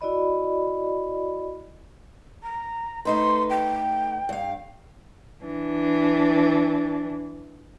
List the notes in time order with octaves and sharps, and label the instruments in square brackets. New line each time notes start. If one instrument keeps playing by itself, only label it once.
[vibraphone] E4 F#4 D5 D#5 B5
[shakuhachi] A#5
[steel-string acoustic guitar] A3 D#4 B4 [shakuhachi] C6
[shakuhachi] G5
[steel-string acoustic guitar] G2 F5
[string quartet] E3 D4